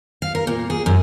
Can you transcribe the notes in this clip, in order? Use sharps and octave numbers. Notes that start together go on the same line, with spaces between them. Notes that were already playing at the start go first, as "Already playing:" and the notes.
F5
A#4
A#2
G#4
F#2